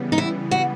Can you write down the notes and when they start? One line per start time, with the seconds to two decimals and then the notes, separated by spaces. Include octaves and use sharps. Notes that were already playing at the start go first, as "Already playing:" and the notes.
Already playing: C#3 E3 G3 B3
0.12 D#4
0.18 E4
0.51 F#4